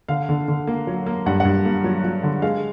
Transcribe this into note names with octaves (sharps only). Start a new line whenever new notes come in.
D3 F5
D3
D3
A#3
F#3
A#3
G2 F#5
F#5
G2
A#3
F#3
F#3
D3
G#3 F5